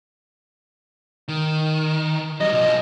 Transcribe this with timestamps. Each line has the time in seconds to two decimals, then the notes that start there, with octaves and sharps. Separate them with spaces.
1.28 D#3
2.41 F#3 G3 D#5
2.53 B1 F3